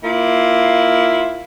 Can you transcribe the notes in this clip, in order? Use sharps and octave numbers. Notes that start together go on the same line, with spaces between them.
A#3 E4 F4